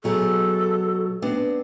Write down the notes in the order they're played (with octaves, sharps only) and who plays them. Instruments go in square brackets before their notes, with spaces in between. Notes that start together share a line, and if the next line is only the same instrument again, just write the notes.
[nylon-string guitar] B2 F#3 G#4 [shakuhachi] A4
[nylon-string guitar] B3 C4 D4